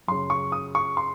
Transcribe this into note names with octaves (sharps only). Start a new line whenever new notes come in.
F#2 C#3 C6
C#6
D#6
C#6
C6